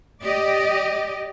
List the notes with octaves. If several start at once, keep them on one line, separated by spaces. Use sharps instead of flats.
G4 D5 D#5